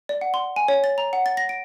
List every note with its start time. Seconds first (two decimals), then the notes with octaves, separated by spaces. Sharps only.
0.09 D5
0.21 F#5
0.34 C6
0.56 G#5
0.68 C#5
0.84 A6
0.98 A#5
1.13 F#5
1.26 A6
1.37 A#6
1.49 D7